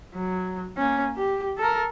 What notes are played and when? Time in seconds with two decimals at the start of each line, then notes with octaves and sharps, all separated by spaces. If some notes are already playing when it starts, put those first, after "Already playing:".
0.15 F#3
0.77 A#3 C#4
1.17 G4
1.58 A4 A#4